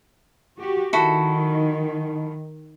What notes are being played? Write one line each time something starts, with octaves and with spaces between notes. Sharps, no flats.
F#4 G4
D#3 E4 F#4 A4